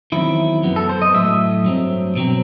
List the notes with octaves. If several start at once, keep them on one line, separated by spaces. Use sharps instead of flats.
E2 D#3 F#3 C4 E4
F#2 F#3 B3
A4
C5
D#5
A2 F#3 A3 E5
G2 F#3 C4
B2 F#3 C4